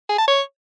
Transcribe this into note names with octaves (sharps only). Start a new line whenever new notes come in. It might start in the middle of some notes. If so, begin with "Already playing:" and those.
G#4
A5
C#5